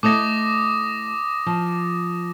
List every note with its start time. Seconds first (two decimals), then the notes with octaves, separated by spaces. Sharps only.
0.03 A3 E4 D#5 D6 D#6 A#6
1.46 F3